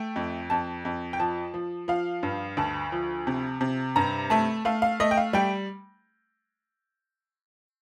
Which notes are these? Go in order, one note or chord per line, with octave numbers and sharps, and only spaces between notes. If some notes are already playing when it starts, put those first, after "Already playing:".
Already playing: A3 G5
F2
F2 A5
F2
G5
F3 A5
F3
F3 F5
G2
D2 A5
F3
C3
C3
G2 A#5
A3 A5
A3 F5
F5
A3 D#5
G5
F5
G3 G5